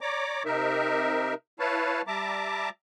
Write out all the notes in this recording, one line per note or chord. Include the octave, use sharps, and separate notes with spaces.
C#5 D5 A#5 D6
C3 D#4 A#4 E5
E4 B4 C#5 F5 A5
G3 E5 A5 A#5 D6